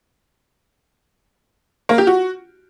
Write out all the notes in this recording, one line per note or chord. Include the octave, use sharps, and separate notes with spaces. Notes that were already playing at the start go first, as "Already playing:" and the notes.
A#3
G4
F#4